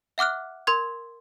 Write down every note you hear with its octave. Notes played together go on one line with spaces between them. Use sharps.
E5 F#5 D6 F6 F#6
A#4 C6 G#6